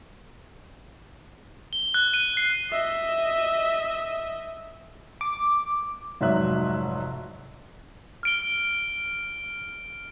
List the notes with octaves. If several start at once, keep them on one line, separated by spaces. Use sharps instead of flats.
G7
F#6
D#7
C7
D#5 E5
D6
F1 G#2 F#3 D#4 E5 F#6
F6 D7 G7